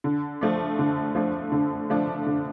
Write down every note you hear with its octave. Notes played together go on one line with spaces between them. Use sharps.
D3
F3 A3 D4
D3
F3 A3 D4
D3
F3 A3 D4
D3